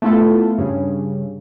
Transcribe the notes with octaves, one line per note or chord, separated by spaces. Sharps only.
A3 B3 E4 F4 A4
G2 C#3